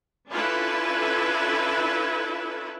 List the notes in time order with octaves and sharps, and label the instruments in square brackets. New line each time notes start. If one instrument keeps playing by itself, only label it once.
[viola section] C#4 D4 E4 F4 A4 B4